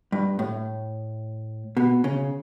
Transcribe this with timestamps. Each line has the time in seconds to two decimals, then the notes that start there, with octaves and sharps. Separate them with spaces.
0.12 G2
0.39 A2
1.77 B2
2.04 C#3